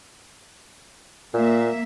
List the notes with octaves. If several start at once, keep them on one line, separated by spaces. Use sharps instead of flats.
A#2 A#3 E5